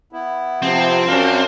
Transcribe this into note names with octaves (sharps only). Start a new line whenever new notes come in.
B3 E4
C3 F3 C4
F#2 D4 F5